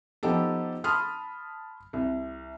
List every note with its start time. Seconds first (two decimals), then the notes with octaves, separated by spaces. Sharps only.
0.23 F3 B3 D#4 G4 A4
0.84 A5 B5 C6 D#6 F6
1.93 C2